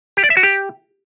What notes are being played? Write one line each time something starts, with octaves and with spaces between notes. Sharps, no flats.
G4
D5
E5
F#4
G4